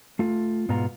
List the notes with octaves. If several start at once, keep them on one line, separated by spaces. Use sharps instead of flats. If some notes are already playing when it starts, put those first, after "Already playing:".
A3 F4
G#2 B2 B3 F4 A#5